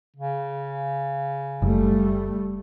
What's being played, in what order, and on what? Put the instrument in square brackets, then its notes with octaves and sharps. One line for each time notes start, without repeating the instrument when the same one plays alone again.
[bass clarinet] C#3
[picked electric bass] F#1 [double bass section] G3 A3